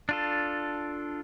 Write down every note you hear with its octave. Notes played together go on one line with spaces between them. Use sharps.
D4 F4 A4